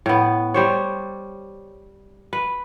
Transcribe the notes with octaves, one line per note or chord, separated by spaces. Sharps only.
A2 B3
G3 C5 C#5
B4